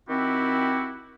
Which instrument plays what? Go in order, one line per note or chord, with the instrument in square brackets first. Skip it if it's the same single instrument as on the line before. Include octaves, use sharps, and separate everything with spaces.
[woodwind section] D#3 C4 E4 F#4 G4